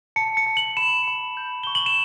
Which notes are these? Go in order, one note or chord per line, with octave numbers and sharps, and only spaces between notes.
A5 C#7
C#7
A5
F#7
B5 E7
B5
G6
C#6 G7
F#7
E7